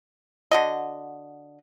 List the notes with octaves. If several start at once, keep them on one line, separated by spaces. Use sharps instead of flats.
D3 F#4 D#5